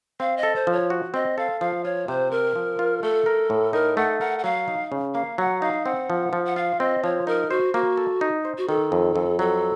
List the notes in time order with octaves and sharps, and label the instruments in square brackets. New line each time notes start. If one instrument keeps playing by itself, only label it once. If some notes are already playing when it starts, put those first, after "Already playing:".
[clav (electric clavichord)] C4 [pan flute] F5
[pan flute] D#5
[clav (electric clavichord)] A4
[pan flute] C5
[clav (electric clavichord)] F3
[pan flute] C#5
[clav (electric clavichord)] F#4
[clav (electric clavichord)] C4 [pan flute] D#5
[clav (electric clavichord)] A4 [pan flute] F5
[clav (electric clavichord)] F3 [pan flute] F5
[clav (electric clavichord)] F4 [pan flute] C#5
[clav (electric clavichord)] C3 [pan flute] C5
[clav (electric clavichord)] C4 [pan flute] A#4
[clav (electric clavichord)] F3
F4
[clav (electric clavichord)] A3 [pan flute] A4
[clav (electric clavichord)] A#4
A2
[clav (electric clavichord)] D#4 [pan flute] A#4
[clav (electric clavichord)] A3 [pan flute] F#5
[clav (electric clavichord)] A#4 [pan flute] F#5
[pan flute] F#5
[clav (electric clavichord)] F#3 [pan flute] F5
[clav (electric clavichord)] D#4
C#3
[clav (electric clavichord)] A#3 [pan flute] F5
[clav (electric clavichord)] F#3 [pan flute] F#5
[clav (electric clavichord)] D#4 [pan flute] F5
[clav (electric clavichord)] C4 [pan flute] F#5
[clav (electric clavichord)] F3
F3
[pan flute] F#5
[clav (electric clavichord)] F4 [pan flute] F5
[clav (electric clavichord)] C4 [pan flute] D#5
[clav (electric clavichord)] F3 [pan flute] C#5
[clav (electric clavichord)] D#4 [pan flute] A#4
[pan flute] F#4 [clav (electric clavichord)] C5
[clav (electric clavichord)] A#3 [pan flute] F#4
[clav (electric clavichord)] A4
D#4
C5
[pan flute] F#4
[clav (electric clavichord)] D#3 [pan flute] A4
[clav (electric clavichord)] F2
F2
[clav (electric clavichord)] F#3 [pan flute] A4